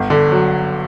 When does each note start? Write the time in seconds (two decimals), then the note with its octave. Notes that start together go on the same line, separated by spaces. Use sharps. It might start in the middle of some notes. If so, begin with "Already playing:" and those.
Already playing: G1
0.10 D3
0.32 F#3